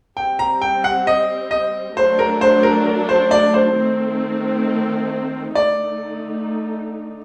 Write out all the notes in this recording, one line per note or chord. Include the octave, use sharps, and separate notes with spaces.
G3 C4 G4 G5
A#5
G5
F#5
D#5
D#5
F#3 A3 D4 C5
A#4
C5
A#4
A#4
C5
D5
C5
D#3 A3 C4
D3 A3 D#4 D5